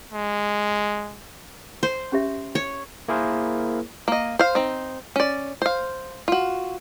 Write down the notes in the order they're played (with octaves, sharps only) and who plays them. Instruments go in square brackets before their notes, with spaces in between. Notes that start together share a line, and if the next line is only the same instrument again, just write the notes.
[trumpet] G#3
[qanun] C5
[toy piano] C#4 G4 E5
[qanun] C#5
[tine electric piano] A#3 E4 G#4 A#4 C5
[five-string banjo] A#3 D#5
C5 F5
C4 D#4
C#4 D5
C5 F5
F4 F#4